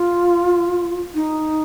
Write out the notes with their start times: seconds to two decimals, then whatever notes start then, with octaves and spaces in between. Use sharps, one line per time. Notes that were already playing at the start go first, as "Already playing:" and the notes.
Already playing: F4
1.15 D#4